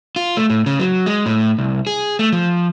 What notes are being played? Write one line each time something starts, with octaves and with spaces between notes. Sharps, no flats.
F4
A3
A2
C#3
F#3
G#3
A2
C2
G#4
A3
F3